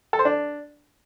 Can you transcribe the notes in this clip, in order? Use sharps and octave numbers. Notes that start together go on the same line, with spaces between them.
A4
C5
D4